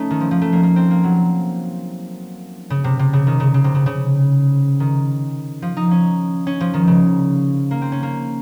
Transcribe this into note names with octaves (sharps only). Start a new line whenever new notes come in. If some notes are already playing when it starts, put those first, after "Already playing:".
Already playing: A3 C#4 D#4
D#3
F3
F3
A3
A#3
A#3
C4
A#3
F#3
C#3
C3
C3
C#3
D#3
C#3
C#3
C3
C#3
C#3
D#3
F3
D#4
C#4
C#4
F3
D#3
C#3
A#3
C4
C#4
A#3